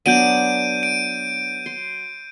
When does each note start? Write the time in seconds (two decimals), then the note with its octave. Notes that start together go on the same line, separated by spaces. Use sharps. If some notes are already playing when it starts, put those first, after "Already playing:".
0.06 F#3 B3 D4 G6 D7 D#7
0.83 D7
1.66 C6